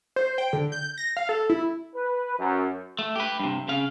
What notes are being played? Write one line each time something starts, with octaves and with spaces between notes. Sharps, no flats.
C5
G5
D3
G6
A#6
F5
A4
E4
B4
F#2
A3
G4 B4
G2 C3
C#3 F5